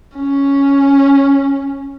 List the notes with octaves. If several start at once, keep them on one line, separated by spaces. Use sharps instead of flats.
C#4